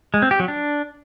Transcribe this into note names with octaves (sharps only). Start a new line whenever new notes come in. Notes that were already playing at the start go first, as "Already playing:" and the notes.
G#3
C4
G4
F#3
D4